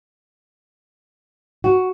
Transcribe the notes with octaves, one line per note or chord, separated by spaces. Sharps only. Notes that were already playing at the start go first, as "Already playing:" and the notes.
F#4